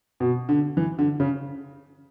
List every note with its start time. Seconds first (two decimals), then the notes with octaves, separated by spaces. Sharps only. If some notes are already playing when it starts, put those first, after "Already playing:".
0.20 B2
0.49 D3
0.77 E3
0.99 D3
1.20 C#3